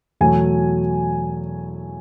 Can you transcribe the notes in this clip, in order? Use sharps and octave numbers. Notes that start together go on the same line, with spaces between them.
E2 B2 F#3 A3 G#5